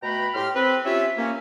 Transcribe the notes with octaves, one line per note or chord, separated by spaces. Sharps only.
B2 A3 B4 G5 A#5 B5
A2 G4 G5 C6 F6
C4 B4
C#4 F4 G4 C#5 E5
A#3 C#4